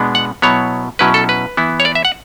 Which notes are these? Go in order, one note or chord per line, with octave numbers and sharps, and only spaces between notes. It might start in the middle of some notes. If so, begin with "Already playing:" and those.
Already playing: B2 G#3 B3 D4
F#5
B2 F#3 B3 E4 C#5
B2 F#3 C#4 E4 B4
A4
B4
E3 B3 E4
C#5
D5
E5
F#5